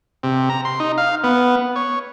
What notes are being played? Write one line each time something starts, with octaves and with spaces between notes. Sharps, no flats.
C3
A#5
C6
D#4
F5
B3
C#5